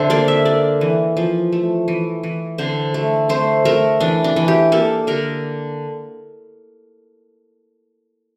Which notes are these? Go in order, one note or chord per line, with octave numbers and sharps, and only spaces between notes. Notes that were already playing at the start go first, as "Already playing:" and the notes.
Already playing: D3 D4 C5 E5
A#3 D5
E5
A#3 D5
E3
F3
A3
E3
E3
D3 C5
A3
A3 C5
A3 A#4
E3 D4
D4
E3
G4
A#3 A4
D3 A#4